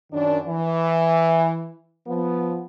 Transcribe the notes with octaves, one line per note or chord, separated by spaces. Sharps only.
F#2 D#3 D4
E3
F3 B3